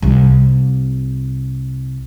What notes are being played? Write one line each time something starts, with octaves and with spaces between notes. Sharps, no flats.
C2 C3